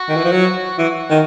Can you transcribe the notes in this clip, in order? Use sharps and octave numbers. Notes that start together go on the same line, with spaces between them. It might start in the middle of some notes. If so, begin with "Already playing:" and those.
Already playing: F#4
D#3
E3
F3
F#3
E3 F#4
D#3